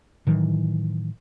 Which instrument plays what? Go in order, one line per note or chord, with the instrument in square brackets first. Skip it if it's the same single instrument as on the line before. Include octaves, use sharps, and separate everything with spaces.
[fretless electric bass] A2 D#3 E3 F#3